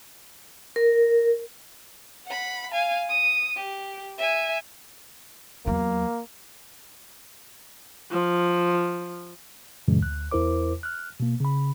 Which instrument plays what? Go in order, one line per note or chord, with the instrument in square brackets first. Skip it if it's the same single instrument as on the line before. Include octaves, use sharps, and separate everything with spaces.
[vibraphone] A#4
[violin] F#5 B5
F5 G#5
D#6
G4
E5 G#5
[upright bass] E2 F#3 [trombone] A#3
[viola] F3
[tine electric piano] F#2 A#2 C#3 E3 G#3
D2 F#6
E2 E4 A#4 C5 D6
F6 F#6
B2 A#3
C#3 B5